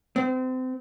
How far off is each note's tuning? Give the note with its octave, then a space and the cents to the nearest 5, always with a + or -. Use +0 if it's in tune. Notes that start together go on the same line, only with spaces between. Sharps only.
C4 -30